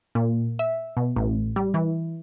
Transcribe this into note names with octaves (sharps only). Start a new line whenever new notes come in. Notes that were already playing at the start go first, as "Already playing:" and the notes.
A#2
E5
B2
A1
G3
E3